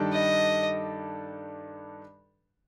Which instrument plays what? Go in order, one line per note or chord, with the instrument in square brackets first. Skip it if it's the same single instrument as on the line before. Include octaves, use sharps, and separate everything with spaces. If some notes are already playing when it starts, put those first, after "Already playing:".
Already playing: [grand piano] G2 D#3 G3 D4 A4
[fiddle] D#5